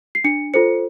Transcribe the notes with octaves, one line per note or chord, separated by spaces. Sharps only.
C7
D4 C#7
F4 A4 C5 C#7